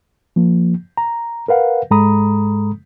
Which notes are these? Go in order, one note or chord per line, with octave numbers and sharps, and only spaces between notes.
F3 A#3
A#5
A#4 B4 F5 F#5
G#2 G#3 A4 A#5 B5 D#6